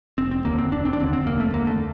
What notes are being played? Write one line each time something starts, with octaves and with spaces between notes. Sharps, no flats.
F1 C4
C4
D#2 D3 A#3
C4
F1 D4
C4
D4
D#2 D3 C4
C4
F1 A#3
A3
D#2 D3 A#3
A3